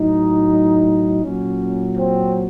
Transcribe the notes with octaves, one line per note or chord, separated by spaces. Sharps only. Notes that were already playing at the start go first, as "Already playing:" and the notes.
Already playing: A2 F#3 D#4
A#2 F#3 C#4
C4